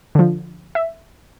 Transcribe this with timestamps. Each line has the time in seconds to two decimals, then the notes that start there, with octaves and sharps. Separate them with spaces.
0.15 D3 F3
0.75 E5